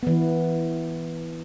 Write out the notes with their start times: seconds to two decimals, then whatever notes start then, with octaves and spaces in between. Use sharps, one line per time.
0.03 E3 B3